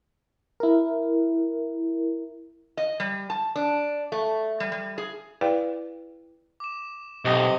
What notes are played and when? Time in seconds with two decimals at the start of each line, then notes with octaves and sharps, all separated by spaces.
0.60 E4 A#4
2.77 D#5
3.00 G3
3.30 A5
3.56 D4
4.12 A3
4.60 G3
4.72 G3
4.98 G#4
5.41 E4 G#4 B4 D5 F5 G5
6.60 D6 E7
7.25 B1 C3 D#5 D#6 F#7 G7